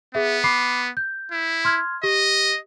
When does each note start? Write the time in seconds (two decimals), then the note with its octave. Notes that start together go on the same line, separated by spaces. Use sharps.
0.15 B3 G#4 E5
0.44 B5 D6 C7
0.97 G6
1.32 E4
1.65 C6 F6 G#6
2.03 G4 D#5